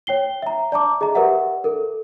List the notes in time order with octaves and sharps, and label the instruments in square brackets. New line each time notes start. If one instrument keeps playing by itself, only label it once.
[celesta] C#5 G5 C7 G7
E5 A#5
D5 A5 A#5 D6
G#4 D#5 E5 A#5
G4 A#4 B4 D5 E5 F#5
A4 A#4